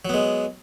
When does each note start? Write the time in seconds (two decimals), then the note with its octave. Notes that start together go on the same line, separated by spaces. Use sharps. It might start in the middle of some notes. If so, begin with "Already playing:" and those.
0.05 F#3
0.09 B3
0.14 G#3